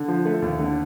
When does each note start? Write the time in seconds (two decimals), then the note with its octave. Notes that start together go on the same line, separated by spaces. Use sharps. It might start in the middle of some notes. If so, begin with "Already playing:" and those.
Already playing: D3
0.08 F3
0.25 A3
0.42 D#2
0.59 D3